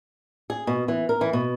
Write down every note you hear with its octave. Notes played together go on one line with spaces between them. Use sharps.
G#4
B2
E3
A#4
E3
B2